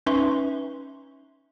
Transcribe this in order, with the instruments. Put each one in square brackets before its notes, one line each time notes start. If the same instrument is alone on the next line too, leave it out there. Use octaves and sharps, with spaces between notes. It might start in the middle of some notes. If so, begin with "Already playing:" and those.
[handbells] C#4 D#4 B4 E5 C6 C#6